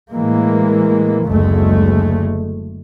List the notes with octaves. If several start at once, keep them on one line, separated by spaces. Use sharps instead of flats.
A2 E3 G#3 A#3
F#1 D2 G#3 A3